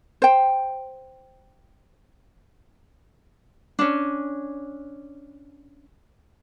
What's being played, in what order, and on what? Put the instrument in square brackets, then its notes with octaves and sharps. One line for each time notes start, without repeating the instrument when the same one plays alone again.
[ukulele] C5 G5
C#4 D4